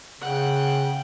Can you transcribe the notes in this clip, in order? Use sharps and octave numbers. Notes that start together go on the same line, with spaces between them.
C#3 F#5 G5